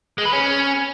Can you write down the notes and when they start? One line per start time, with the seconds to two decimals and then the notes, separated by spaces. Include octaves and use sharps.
0.18 G#3
0.25 B4
0.33 C#4